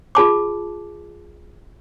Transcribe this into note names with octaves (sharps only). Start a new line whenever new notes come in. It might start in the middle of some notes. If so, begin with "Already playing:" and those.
F4 G#4 A5 D6